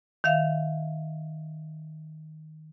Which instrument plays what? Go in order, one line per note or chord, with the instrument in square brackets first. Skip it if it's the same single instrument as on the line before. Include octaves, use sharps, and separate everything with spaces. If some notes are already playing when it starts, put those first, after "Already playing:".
[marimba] D#3 E5 F5